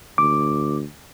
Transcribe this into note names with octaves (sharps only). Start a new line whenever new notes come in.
D2 D6